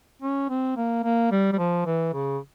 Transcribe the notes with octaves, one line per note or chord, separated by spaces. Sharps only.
C#4
C4
A#3
A#3
G3
G3
F3
E3
C#3